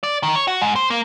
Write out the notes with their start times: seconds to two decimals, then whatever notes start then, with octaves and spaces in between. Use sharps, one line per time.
0.03 D5
0.23 D#3
0.35 C#5
0.48 F#4
0.62 G#2
0.76 C5
0.90 A#3